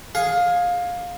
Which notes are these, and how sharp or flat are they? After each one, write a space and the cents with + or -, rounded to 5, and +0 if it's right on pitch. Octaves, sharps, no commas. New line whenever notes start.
G#4 +0 F5 +20